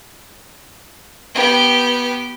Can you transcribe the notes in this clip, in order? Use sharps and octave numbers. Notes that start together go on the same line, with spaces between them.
B3 G4